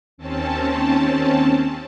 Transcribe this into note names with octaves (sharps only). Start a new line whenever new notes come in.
D#2 C4 C#4 A5